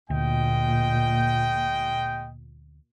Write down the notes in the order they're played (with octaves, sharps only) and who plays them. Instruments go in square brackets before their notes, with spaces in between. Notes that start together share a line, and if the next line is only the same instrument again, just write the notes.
[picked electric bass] D2 [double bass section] A#2 [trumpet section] G#3 D#5 G5